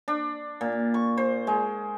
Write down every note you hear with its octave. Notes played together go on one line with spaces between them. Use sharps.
D4
A#2
C#6
C5
G#3